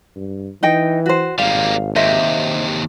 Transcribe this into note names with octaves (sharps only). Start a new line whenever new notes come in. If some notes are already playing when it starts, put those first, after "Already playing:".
G2
E3 D#4 D#5 G5
F#4 C5
G#1 G3 A#3 F5
D#2 C3 C5 D#5 E5